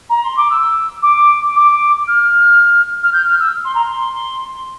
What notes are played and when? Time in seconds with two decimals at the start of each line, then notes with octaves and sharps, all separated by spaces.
0.10 A#5
0.24 C6
0.37 D6
0.50 E6
1.02 D6
1.55 D6
2.07 F6
3.03 F6
3.13 G6
3.26 F6
3.39 E6
3.65 C6
3.75 A#5
3.84 C6